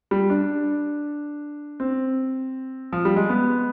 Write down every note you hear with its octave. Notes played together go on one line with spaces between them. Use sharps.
G3
D4
C4
F3
G3
G#3
B3